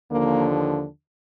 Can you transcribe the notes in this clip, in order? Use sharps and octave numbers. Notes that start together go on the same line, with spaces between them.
D#2 D3 F3 A#3